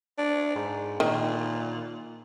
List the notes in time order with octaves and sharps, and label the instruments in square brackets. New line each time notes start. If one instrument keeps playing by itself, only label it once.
[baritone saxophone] D4
G#2
[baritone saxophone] A#2 [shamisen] D#3